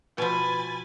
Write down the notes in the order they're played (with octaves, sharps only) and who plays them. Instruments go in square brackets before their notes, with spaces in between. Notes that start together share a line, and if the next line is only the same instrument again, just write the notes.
[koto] B2 F3 [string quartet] G#5 B5 A6